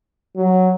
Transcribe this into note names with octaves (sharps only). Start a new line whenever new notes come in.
F#3